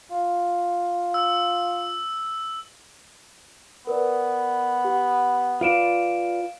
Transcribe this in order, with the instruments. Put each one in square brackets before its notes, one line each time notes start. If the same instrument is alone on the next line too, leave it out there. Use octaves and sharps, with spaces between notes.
[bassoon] F4
[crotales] E6
[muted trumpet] B3 [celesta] A#4 B4 D5
[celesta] G4 F#5
[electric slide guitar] F4 B4 D5 [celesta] F5 D7 E7